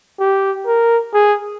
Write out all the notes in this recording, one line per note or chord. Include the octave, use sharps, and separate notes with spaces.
G4
A#4
G#4